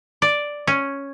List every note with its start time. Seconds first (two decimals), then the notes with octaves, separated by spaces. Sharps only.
0.22 D5
0.67 C#4